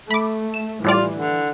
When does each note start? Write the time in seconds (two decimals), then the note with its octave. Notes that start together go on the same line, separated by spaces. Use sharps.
0.11 A3 B5 D6
0.54 E7
0.84 A2 E3 G3 F4 D5
1.16 D3